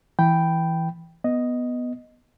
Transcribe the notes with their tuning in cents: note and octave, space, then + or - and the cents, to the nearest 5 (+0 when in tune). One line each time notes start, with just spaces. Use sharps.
E3 +0 G5 +0 B5 +0
B3 +0 D#5 +0